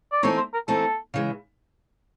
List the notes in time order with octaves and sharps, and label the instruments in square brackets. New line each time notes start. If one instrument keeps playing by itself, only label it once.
[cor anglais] D5
[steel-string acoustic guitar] E3 A3 C4 D#4 [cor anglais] C#5
[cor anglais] C5
A#4
[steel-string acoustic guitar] E3 A3 C4 D#4 [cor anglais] A4
[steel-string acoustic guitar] C#3 E3 G#3